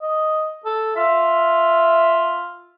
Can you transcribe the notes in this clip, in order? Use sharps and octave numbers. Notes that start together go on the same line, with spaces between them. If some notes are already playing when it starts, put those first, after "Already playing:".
D#5
A4
F4 E5